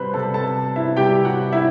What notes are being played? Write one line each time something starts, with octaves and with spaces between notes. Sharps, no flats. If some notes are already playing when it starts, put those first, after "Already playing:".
Already playing: C3 G3 B4 C5 B5
C3 G3 A4 A5
A4 A5
E4 E5
C3 G3 G4 G5
F#4 F#5
E4 E5